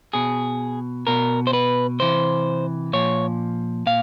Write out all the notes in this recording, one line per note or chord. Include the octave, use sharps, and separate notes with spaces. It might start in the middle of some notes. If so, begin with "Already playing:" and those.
B2 G#4
B2 A#4
C5
B4
C3 E3 C5
A#2 F3 C#5
A#2 F5